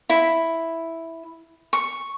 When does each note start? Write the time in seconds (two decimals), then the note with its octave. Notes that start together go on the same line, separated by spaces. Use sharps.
0.10 E4
1.73 C#6